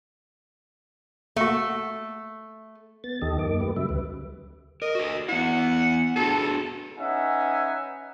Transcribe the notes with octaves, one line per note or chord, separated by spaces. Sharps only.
A3 A#3 F#4
B3 A6
D#2 D#3 G4 A4 D#5
F#2 A#3 D#4 D6
A3 G4 B4
C#3 F#3 G3 E5
D2 B4
A#4 D#5
F#4 A4
B3 E4 F#5
D4 F#4 G#4 A4
C#4 D#4 B4 E5 F#5 G#5